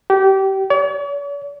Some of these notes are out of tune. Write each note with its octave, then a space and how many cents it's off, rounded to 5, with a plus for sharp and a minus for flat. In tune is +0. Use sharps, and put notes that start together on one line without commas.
G4 -25
C#5 +45